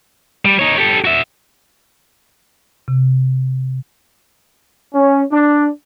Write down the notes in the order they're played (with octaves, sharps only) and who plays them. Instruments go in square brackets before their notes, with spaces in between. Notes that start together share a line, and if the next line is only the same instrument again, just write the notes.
[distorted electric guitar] G3
D#4 C#5
G4 A4
F#4 E5
[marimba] C3
[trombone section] C#4
D4